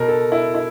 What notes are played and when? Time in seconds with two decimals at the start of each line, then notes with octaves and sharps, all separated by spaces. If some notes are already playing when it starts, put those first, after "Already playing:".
Already playing: B2 A#4
0.08 A4
0.32 E4
0.55 E4